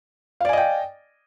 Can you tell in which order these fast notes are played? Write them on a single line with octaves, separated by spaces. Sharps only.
F5 D5 G#5 D#5 G5